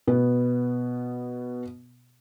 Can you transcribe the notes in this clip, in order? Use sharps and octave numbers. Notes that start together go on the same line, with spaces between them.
B2 B3